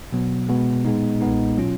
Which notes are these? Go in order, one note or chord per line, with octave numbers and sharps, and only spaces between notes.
B2 F#3 B3
B2 G#3 B3
A#2 G#3 B3 D#4
B1 A#2 G#3 B3 D#4
B2 F#3 C#4 F4